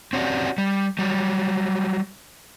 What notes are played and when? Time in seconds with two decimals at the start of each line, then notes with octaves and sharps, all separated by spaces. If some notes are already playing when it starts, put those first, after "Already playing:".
0.13 C4 C#4 F#4 G4 D5
0.58 G3
0.99 F#3 G3